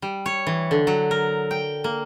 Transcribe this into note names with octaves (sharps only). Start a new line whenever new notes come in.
G3
C#5
E3
D3
F#3
A#4
G5
A#3